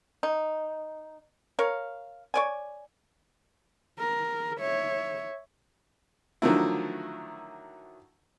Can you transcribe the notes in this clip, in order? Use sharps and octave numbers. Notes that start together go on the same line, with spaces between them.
D#4
A#4 C#5 F5
C#5 D5 G#5
A#4
C#5 E5
D3 D#3 F3 F#3 A3 E4